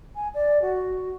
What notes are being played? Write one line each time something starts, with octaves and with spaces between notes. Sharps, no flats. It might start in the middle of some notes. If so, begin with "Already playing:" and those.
G#5
D5
F#4